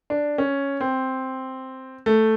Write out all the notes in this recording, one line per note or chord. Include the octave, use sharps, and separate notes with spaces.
D4
C#4
C4
A3